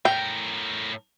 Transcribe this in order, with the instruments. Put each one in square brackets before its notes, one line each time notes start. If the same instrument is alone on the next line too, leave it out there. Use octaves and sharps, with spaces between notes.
[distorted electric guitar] A2 A#4 [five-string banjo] G5